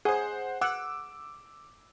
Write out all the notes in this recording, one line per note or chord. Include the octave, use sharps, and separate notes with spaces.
G#4 C5 F#5
F#5 D6 E6